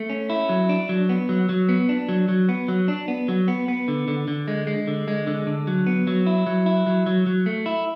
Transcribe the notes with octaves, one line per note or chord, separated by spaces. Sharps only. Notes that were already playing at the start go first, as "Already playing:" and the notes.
Already playing: A3
C#4
E4
F#3
D4
F#3
B3
F#3
F#3
B3
D4
F#3
F#3
B3
F#3
D4
B3
F#3
B3
B3
D3
D3
D3
G#3
G#3
D3
G#3
D3
D3
F#3
B3
F#3
E4
F#3
E4
F#3
F#3
F#3
A3
E4